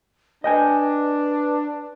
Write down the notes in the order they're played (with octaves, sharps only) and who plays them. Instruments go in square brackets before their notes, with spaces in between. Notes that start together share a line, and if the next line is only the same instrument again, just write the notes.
[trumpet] D4 [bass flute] B4 [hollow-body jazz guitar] D#5 G5 G#5